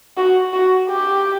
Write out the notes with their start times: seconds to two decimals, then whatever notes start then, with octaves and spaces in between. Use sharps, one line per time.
0.17 F#4
0.53 F#4
0.89 G4